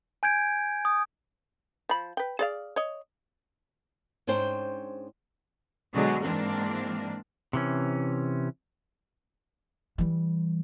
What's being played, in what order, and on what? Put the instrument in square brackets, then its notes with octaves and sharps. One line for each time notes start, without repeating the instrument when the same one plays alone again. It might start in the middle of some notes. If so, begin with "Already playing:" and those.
[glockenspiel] G#5 G6 G#6 D7
D#6
[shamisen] F3 B5
B4 G5
G#4 D5 F5
C#5 D#5
[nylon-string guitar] G#2 C#4 D4 C5 G5
[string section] B2 D3 F#3 G#3
G#2 E3 A#3 C4 D4
[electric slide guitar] C3 E3 C#4
[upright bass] E3 G3